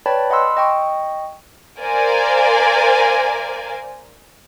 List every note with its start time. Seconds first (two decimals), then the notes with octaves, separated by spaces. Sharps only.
0.06 B4 C#5 D5 G5 A5 B5
0.30 D#5 F#5 B5 C6 E6
0.57 D#5 G5 C#6
1.80 A#4 C5 D5 F5 G#5